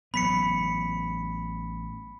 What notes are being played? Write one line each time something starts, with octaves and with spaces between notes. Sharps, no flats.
A1 F#3 B3 B5 B6 C#7